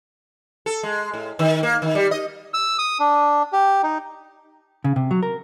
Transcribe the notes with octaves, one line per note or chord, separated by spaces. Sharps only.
A4
G#3
A2
D#3
A#3
D#3
G3
D#5
E6
D#6
D4
G4
D#4
C#3
C3
F#3
A#4